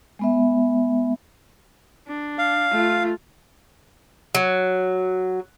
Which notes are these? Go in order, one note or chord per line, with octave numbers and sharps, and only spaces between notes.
G#3 B3 E5
D4
F5
A3 F4
F#3